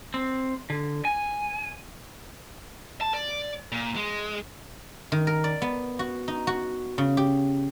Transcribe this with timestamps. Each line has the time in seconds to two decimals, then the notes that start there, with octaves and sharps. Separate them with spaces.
0.14 C4
0.70 D3
1.05 G#5
3.01 A5
3.14 D5
3.72 A#2
3.96 G#3
5.12 D#3
5.27 A#4
5.44 D5
5.62 B3
5.99 F#4
6.28 D#4
6.47 F#4
6.98 C#3
7.17 G4